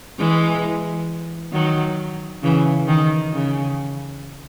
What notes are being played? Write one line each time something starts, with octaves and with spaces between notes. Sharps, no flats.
E3 G#3
D#3 F#3
C#3 E3
D#3
C#3